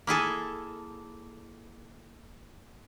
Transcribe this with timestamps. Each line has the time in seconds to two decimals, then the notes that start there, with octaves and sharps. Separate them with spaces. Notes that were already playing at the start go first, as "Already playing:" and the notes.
0.07 A#3 E4 G#4 A4